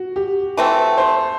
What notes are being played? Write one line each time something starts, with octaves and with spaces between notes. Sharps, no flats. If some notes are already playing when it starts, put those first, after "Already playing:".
Already playing: F#4
G4
E3 A3 C4
C5